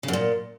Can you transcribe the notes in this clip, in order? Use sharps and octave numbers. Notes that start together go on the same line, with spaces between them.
C#3
F#2
A#2